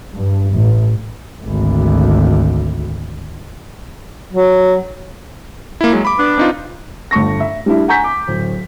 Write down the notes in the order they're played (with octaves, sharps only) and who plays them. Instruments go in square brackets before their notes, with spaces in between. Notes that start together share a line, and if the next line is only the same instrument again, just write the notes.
[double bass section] G2
A1
[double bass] G#1 D2
[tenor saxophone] F#3
[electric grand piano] A#3 E4
F#3 G#3
B5 D6
[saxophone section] B3 D4
[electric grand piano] C4 D#4 F4
[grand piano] G1 A3 C#6 A#6
E5
G3 D4 E4
F#5 G#5 A#5 C#6 G6 B6
D6
D1